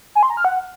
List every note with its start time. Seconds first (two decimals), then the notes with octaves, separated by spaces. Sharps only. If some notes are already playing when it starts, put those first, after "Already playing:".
0.15 G#5
0.23 C6
0.30 A#5
0.37 F6
0.45 F#5